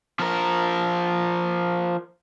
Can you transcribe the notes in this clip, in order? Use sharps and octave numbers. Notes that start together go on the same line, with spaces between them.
F3 A#4